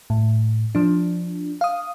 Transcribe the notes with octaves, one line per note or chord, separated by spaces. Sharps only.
A2
F3 D4
F5 D#6